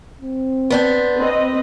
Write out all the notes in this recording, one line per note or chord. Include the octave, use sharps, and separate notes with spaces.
C4
B3 D4 C5
C4 B4 D#5